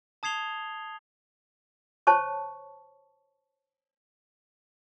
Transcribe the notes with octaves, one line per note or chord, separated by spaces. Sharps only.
A5 D#6 G#6 C7 F7 G7
C5 C#5 A5 C#6